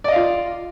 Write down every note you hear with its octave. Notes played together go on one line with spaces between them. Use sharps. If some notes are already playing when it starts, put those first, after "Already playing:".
F4 D5 D#5 F5